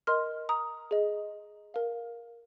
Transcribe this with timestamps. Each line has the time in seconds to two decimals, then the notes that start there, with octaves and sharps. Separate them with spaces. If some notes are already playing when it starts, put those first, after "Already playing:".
0.07 A#4 D#5 C6 F6
0.49 A#5 D#6
0.91 G#4 D#5
1.74 A#4 F5